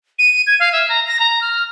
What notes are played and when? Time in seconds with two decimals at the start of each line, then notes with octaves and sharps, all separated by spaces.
0.19 D#7
0.47 G#6
0.60 F5
0.72 E5
0.89 A#5
1.07 A#6
1.19 A#5
1.41 F6